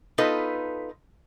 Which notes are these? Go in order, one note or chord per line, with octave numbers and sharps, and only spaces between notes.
B3 D#4 F4 A4 B4